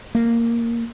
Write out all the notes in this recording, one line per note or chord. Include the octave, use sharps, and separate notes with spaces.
A#3